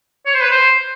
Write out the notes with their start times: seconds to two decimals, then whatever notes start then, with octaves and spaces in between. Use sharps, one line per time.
0.26 C#5
0.33 C5
0.41 B4
0.51 C5